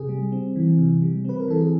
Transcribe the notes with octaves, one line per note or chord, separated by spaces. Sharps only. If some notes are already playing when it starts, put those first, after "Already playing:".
Already playing: C3 G#4
G3
C4
E3
C3
G3
C4 B4
A#4
E3 A4
G#4